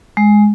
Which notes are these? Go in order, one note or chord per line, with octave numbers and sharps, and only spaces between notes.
G#3